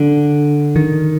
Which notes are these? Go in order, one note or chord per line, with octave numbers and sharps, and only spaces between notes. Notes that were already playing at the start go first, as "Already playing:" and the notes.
Already playing: D3
D#3